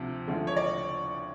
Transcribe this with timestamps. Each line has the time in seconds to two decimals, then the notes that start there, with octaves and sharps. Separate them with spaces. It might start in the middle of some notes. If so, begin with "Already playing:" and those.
Already playing: D2 C3 F3
0.27 D2 D3 F3 G#3
0.47 C#5
0.56 D5